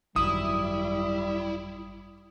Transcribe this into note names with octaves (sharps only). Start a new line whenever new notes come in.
G#1 F#2 D#3 G3 E4 D#6